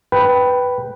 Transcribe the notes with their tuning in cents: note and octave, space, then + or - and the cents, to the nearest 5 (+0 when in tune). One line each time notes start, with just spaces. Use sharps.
B4 +0 G5 -10